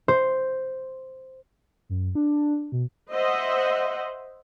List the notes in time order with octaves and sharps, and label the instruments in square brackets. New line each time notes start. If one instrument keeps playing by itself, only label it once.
[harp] C5
[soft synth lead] F#2
D4
B2
[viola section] C5 D#5 E5 F#5